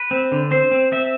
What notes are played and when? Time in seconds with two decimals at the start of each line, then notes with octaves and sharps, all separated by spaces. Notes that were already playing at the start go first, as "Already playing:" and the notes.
Already playing: B4
0.11 C4
0.32 D3
0.51 C4 C5
0.71 C4
0.92 C4 E5